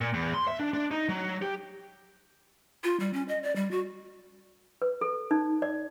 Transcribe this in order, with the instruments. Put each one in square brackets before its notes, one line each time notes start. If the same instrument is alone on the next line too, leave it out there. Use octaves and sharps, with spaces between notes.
[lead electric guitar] A#2
E2
C6
E5
D4
D4
D#4
F#3
G4
[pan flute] F4
G3
C#4
D#5
D5
G3
F#4
[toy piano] B4
A4
D#4
D5